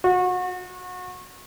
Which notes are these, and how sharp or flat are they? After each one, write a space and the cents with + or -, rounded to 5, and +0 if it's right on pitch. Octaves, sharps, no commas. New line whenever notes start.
F#4 -30